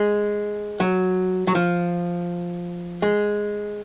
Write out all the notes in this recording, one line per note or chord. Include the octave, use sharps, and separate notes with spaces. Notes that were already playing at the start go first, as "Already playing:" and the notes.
Already playing: G#3
F#3
F#3
F3
G#3